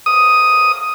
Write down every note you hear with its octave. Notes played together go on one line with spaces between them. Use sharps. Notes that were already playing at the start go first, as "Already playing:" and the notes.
D#6